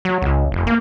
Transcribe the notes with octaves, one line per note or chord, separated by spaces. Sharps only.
F#3
C#2
F1
A#3